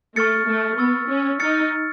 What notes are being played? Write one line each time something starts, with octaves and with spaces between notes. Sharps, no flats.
A3 C#6 F6 A6 C#7
A3
B3 C#6 E6 A6
C#4
D#4 F6 A6 C#7